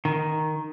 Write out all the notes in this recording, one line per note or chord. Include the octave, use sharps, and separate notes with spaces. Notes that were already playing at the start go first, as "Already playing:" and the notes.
D#3